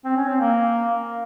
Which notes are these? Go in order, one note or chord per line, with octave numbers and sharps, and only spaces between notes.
C4
C#4
C4
A#3